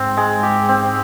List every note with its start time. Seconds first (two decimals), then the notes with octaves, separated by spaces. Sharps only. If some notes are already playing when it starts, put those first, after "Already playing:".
Already playing: G#2 C4
0.17 G#3
0.43 G4
0.69 C4